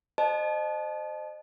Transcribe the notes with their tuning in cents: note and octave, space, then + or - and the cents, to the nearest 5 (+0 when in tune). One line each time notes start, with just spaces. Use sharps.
C5 +0 D#5 -30 A5 -30